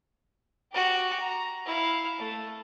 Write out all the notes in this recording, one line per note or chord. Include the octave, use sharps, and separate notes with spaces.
F#4 G4
A#5
E4 F5
A3